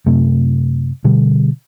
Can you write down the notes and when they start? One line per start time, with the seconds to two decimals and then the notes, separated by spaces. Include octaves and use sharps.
0.06 F#2 C3 A3
1.04 B2 D3 G3